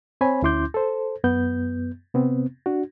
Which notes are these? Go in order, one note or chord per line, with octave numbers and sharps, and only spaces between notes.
C4 C5 C#5 G#5 B5
D2 C#4 E4 C6 D6 G6
A4 C5
F#2 B3 G6
C3 B3 C4
D4 F#4